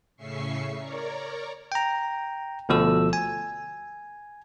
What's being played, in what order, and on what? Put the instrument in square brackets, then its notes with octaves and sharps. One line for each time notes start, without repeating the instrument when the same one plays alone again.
[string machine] A2 C#3 C#4 E5 C#6 C7
A#4 C#5 D5 A#5
[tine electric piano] G5 A#5
D2 B2 F3 A4 E6
G#5